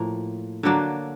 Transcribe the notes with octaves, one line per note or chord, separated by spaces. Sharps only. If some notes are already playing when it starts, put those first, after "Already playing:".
Already playing: A2 F3 A#3
D3 F#3 A#3 D4